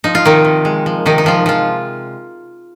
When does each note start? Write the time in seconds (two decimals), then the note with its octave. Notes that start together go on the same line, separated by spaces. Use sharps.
0.04 F3 D#4
0.15 F4
0.25 C3 D#3 D#4
0.45 C3
0.65 G#3
0.86 F3
1.06 C3 D#3 D#4
1.18 D#4
1.24 C3 F3 F4
1.46 F3 G#3 F4